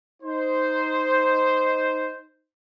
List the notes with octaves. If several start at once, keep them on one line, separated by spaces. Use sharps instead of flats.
D#4 C5